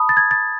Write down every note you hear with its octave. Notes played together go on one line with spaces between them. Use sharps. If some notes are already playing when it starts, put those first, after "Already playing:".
Already playing: A5 B5 D#6
A6
G#6
A6